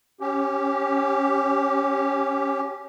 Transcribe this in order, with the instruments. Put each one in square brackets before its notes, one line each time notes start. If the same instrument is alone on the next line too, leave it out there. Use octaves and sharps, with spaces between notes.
[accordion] C#4 G4